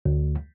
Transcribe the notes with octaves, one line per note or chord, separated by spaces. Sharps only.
D2